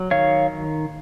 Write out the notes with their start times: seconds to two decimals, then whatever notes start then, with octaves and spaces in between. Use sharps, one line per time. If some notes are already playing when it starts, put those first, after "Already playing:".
Already playing: F#3
0.11 D#3 C#5 F5